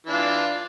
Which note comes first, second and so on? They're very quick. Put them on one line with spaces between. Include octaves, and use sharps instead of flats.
E3 D4 F4